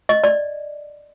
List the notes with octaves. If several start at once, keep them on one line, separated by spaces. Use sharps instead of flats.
D#5
D5